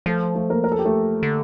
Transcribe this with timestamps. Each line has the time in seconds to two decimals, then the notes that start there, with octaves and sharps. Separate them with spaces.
0.06 F3 A3 A4
0.35 A3 A4
0.50 A#3 A#4
0.64 A#4
0.72 A4
0.79 G4
0.85 A3 A4
1.23 D3